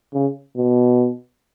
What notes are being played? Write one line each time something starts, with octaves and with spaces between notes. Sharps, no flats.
C#3
B2